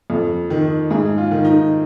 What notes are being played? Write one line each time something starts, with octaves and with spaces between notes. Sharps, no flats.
F2
D#3
G#2 G#4
F4
D#3
D#4